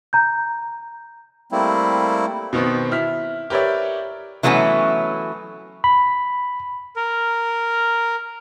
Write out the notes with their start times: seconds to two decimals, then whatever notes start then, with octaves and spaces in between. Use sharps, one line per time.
0.13 A#5 G6
1.52 G3 A3 A#3 C4 E4
2.53 B2 D#3 B3 C4
2.91 E4 F6 B6
3.50 G4 A#4 B4 C#5 D5 E5
4.43 E3 F#3 A3 B3 C#4
5.84 B5
6.96 A#4